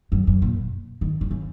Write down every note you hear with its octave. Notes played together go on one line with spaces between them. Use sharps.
F#2
F#2
A#2
D#3
D#3
C#3